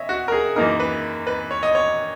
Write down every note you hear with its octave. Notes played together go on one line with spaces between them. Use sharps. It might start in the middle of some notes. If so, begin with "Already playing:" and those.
Already playing: C#5 D#5 E5
F#4
A#4
G#4
F#2 E3 A#3 D#4 A#4
B4
B4
C#5
D#5
C#5